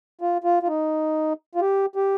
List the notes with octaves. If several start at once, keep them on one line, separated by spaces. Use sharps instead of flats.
F4
F4
F4
D#4
F4
G4
G4